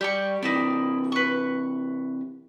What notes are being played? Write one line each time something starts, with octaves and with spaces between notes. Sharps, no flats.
G3 G4 D5 C#6
C3 E3 D#4 E4 D5
B4 C#6